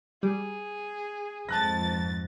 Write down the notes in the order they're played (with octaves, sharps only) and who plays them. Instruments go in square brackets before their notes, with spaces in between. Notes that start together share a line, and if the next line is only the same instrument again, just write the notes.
[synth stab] G3 [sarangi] G#4
[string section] F2 G#2 A6 [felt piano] A5 F#6 A#6